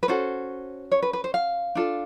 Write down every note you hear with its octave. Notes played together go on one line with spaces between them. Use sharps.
B4
C#4 F#4 A4 C5
C#5
B4
B4
C5
F5
D4 F4 A4